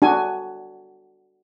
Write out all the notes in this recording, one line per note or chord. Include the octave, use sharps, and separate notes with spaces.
D4 F#4 G#5